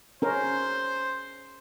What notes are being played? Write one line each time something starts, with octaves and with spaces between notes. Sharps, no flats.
C#4 A#4 C5